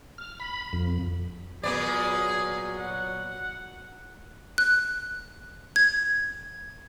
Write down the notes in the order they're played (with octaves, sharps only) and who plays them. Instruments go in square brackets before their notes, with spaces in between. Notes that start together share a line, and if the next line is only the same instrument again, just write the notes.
[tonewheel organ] F6
B5
F2
[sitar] A#2 B3 D5 [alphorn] F#3 [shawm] G#4
[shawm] F#5
[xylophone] F#6
G#6